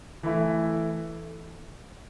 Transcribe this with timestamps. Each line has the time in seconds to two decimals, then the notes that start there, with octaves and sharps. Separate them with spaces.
0.23 E3 A3 E4